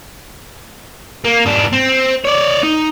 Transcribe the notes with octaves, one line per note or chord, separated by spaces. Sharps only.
A#3
G#2 D4
C4
C#5 D5
D#4